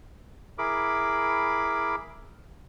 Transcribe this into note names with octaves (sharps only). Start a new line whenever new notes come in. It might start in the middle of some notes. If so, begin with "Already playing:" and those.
E4 G#4 A#4 B5 D6